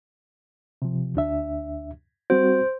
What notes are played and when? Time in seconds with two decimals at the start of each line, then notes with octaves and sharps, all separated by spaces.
0.82 C3 F3
1.16 D2 D4 E5
2.30 G3 C4 F#4 C5